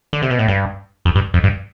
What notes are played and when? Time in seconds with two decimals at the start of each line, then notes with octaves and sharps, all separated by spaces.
0.13 D3
0.22 C3
0.30 B2
0.39 A2
0.48 G2
1.05 F2
1.15 G2
1.34 F2
1.44 G2